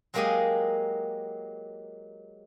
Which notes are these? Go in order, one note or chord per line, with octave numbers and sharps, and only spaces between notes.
F#3 G#3 A#3 G4 G#4 D#5